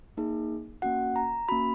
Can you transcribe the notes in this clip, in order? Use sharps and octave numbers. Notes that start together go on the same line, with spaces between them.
A#3 D#4 G#4
A#3 C#4 F#4 F#5
A#5
A#3 C#4 F#4 B5